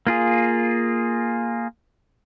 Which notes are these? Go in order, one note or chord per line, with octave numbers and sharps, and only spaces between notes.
A#3 F4 G#4